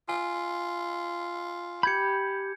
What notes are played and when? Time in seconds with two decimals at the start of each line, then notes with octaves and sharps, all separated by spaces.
0.09 F4 G#5
1.83 G4 B5 G6 G#6 C#7